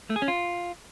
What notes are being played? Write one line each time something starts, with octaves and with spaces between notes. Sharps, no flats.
A3
G#4
C#4
F4